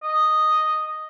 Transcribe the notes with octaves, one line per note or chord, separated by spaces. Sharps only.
D#5